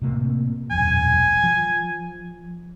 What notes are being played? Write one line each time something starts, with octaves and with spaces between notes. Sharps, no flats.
A2 C3 A#3
E1 A#1 F#2 G#5
F3